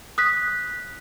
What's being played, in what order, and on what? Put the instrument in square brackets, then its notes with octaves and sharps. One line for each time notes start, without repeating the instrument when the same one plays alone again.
[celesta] D#6 F#6 B6